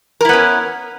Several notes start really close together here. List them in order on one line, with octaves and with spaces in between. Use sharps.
A#4 E4 B3 C#4